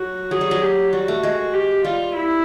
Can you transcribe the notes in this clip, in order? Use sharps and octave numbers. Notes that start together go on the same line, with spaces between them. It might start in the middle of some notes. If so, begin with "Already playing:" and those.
Already playing: F#3 F#4
F#3 G#4
G3
F#3
G4
G3 F#4
A3
G#3
G4
G3 F4
E4